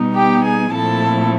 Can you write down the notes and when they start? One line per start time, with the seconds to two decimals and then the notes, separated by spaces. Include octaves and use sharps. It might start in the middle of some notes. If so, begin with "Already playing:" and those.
Already playing: B2 G3 B3 D#4
0.15 G4 G5
0.44 G#4 G#5
0.72 A#2 F3 A3 C4 E4 A4 A5